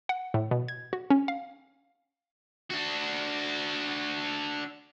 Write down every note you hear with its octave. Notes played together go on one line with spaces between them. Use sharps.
F#5
A2
B2
G#6
F#4
C#4
F5
D4 F#4